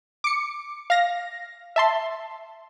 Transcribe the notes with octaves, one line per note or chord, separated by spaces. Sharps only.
D6 C#7
F5 A#6
E5 A5 C6